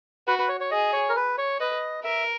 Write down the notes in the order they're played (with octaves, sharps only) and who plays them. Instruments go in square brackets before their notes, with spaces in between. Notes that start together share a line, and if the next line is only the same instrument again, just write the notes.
[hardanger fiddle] F#4 [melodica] B4
[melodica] B4
C#5
C#5
[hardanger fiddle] G#4 [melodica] D#5
[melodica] C#5
A#4
B4
C#5
[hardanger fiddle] B4 [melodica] D#5
[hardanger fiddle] A#4 [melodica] E5